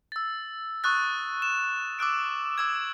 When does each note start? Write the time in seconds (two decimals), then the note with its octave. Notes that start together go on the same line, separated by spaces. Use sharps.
0.12 E6 A6
0.84 C#6 D#6 F#6 A6
1.42 E7
1.99 D6 E6 F#6 D7
2.58 D6 E6 G#6